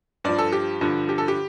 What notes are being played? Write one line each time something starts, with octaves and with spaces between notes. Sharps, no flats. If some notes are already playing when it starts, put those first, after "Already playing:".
G2 F3 D5
A4
G4
G2 D3 F3
G4
A4
G4